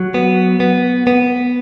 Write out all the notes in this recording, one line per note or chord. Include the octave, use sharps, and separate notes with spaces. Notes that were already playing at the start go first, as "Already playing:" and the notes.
Already playing: F#3
B3
B3
B3